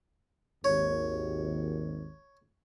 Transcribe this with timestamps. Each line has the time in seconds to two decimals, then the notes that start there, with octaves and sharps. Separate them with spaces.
0.64 G#1 D#2 C#5